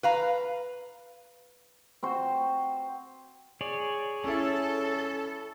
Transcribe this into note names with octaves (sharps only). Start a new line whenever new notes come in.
B4 F5 A#5
C4 F#4 C5
G#4 C#5 D5
C#4 E4 A4